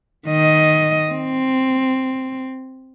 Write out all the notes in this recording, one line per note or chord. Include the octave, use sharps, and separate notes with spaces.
D#3 D#5
C4